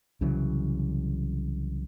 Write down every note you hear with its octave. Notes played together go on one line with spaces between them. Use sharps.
C2 C#3 E3 F#3